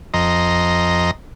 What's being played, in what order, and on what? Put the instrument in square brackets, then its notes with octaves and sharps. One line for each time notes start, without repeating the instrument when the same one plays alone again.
[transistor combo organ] F2 D#5 A#5 C6